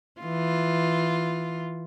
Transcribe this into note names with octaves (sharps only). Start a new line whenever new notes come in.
E3 F4